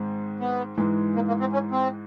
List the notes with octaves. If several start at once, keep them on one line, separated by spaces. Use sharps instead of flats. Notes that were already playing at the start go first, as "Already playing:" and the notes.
Already playing: G#2 D#3 G#3 C4
B3
G#2 E3 G#3
A#3
A#3
C4
C#4
C4